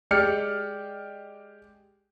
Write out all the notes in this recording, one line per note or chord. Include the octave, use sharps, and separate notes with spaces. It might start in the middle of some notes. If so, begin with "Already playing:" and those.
G#3 G4 D5 F6 C#7